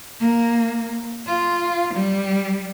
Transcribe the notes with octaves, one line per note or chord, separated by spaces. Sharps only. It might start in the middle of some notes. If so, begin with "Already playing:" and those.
A#3
F4
G3